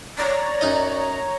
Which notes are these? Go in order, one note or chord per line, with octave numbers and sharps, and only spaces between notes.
C#5 D5 A#5
F#2 D#4 D#5